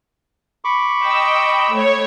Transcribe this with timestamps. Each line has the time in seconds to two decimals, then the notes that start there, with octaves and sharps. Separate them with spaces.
0.65 B5 C#6 D6
1.04 D#5 G5 E6
1.74 A3 C#5